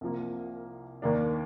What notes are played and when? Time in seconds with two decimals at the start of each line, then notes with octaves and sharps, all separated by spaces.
0.01 C2 C3 F3 A#3
1.02 D#2 D#3 A#3 D4